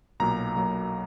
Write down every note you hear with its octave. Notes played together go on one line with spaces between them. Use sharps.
B1 A#2 F#3 A#3 A#5
B1 A#2 F#3 A#3